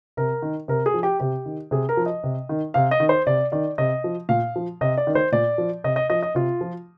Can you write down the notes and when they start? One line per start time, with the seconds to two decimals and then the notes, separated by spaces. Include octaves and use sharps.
0.17 C3 A#4
0.42 D#3
0.68 C3 A#4
0.86 G#4
0.94 F3
1.03 G4
1.20 C3 G4
1.46 D#3
1.71 C3 G#4
1.89 A#4
1.97 F3
2.06 D#5
2.24 C3
2.49 D#3
2.74 C3 F5
2.91 D#5
3.00 D#3
3.09 C5
3.27 C3 D5
3.52 D#3 D5
3.78 C3 D#5
4.04 F3
4.29 A#2 F5
4.56 F3
4.81 C3 D#5
4.97 D5
5.07 D#3
5.15 C5
5.32 A#2 D5
5.58 F3
5.84 C3 D#5
5.96 D#5
6.10 F3 D#5
6.23 D#5
6.35 C3 F4
6.61 F3